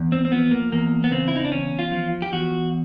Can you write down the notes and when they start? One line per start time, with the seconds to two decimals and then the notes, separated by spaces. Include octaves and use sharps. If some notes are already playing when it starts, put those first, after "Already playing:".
Already playing: E2
0.12 C4
0.25 C4
0.32 F3 B3
0.51 A#3
0.72 E2 A#3
1.04 B3
1.11 C#3 C4
1.28 E4
1.36 D#4
1.45 D4
1.52 E2 C#4
1.79 F4
1.92 F3
2.22 G4
2.32 E2 F#4